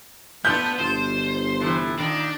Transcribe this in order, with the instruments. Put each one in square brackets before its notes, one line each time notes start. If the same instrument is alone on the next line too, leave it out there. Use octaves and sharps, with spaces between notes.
[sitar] A3 D4 F4 [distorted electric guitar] B3 [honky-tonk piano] G6
[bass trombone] G1 [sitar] B2 F4 [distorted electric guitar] C5
[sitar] C3 E3 A3
[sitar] A#2 D#3 [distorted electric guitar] D4